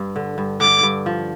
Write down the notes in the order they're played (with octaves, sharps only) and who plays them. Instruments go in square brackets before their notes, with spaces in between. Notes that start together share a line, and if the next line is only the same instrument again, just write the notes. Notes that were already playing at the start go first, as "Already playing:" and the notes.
Already playing: [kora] G2
D3
G2
[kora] D3 [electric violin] D6
[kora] G2
F3